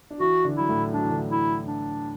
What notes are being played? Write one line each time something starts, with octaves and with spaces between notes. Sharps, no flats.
D4
E3 E4 F#4
D3 D4
F#3 E4
A2 A3
F#3 D4
E3
D3
E3
E4
D4